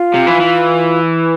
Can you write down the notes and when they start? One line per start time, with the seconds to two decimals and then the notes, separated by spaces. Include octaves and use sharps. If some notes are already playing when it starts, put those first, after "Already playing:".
Already playing: F4
0.14 C3
0.27 E3
0.40 E3